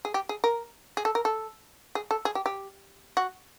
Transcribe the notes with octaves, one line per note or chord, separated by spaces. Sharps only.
G#4
G4
G#4
A#4
G#4
A4
A#4
A4
G#4
A4
G#4
G4
G4
F#4